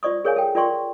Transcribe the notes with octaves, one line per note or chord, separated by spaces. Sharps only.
F4 C5 D5 C#6 D#6
G#4 A#4 C#5 F5 G#5
A4 G5
F4 A#4 D5 G5 C6 C#6